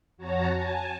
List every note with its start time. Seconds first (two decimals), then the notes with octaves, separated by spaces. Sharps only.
0.17 F2 F#4 C#5 A5 A#5
0.54 G#5 A5